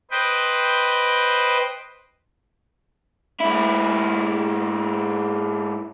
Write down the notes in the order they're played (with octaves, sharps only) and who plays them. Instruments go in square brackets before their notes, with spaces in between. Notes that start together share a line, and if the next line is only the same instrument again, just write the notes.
[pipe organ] B4 C5 D#5 G5
[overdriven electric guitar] G#2 E4